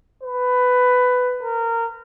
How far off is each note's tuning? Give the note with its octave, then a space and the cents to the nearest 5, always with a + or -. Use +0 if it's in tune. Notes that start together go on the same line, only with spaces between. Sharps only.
B4 +15
A#4 -20